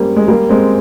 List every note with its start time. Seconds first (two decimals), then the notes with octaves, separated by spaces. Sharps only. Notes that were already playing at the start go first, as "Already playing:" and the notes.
Already playing: G3 G#3 A#3 C4 C#4
0.16 G#3
0.28 G3 A#3
0.49 G#3 C4